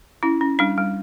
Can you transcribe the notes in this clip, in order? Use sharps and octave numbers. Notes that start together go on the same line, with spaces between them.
C#4 E4
C#4
G3 D4
G3